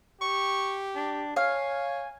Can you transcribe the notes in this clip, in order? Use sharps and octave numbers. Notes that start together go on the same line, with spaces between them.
G4 C#6
D4
C#5 F5 G#5